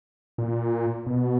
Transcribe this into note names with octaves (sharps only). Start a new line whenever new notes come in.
A#2
B2